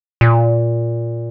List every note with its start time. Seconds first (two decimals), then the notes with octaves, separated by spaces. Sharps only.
0.21 A#2